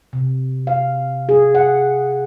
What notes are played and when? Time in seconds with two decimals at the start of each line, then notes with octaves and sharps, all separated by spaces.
0.13 C3
0.67 F5
1.29 G#4
1.55 F#5